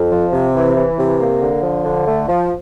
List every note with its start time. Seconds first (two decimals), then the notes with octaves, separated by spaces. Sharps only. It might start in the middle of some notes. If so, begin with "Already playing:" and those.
Already playing: F2
0.11 F3
0.33 C3
0.55 E3
0.77 E3
0.98 C3
1.20 A#3
1.42 D3
1.63 F3
1.84 D3
2.07 A3
2.28 F3